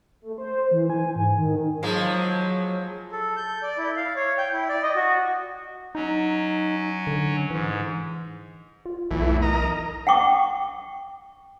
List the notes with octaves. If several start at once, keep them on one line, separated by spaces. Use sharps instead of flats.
A3
C5
E3
G#5
G#2
D#3
F3 F#3 G#3 A#3
A4
G6
D5
E4
F5
C#5
G5
E4
D5
D#5
F#4
F#3 C#4 D#4
D3
G#2 E3
F4
B1 E2 A2 E3
A#4 D#5 A#5
F#5 G5 C#6 D6